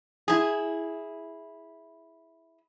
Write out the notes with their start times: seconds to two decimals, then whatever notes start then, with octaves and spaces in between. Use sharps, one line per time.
0.28 E4 G#4